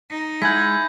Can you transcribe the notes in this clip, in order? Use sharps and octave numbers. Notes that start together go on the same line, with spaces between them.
D#4
G#3 E4 F#5 G#5 G6 G#6 B6